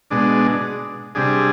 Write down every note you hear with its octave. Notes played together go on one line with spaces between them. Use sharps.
B2 G#3 D4
C3 G3 D4 G#4